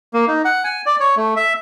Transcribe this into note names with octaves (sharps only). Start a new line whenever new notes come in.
A#3
D#4
F#5
G#5
D5
C#5
A3
E5